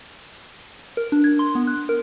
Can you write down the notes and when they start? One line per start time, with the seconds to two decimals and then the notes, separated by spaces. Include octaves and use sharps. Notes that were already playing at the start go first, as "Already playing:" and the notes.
0.97 A#4
1.12 D4
1.24 G#6
1.39 C6
1.55 B3
1.67 F#6
1.89 A#4